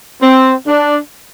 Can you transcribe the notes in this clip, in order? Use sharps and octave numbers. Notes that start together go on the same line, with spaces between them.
C4
D4